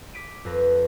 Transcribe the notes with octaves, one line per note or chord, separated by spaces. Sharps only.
D6 B6 D7 D#7
F2 B4 A#6